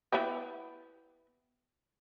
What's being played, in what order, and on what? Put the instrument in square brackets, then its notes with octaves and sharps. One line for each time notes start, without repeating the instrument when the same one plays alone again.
[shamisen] B3 E4 G4